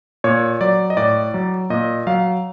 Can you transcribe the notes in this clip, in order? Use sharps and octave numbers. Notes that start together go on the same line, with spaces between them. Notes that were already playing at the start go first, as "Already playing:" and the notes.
A#2 C#5
F#3 D5
D#5
A2 D5
F#3
A#2 D#5
F#3 F5